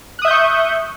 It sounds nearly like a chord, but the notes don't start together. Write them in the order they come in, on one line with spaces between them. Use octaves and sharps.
F#6 D#6 E5 G6 C#6